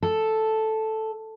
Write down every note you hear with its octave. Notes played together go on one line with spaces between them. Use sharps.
A4